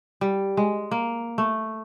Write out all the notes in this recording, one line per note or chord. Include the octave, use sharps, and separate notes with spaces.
G3
G#3
A#3
A3